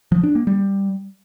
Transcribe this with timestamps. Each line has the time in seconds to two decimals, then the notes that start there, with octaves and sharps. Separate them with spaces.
0.12 F3
0.23 D4
0.35 A#3
0.47 G3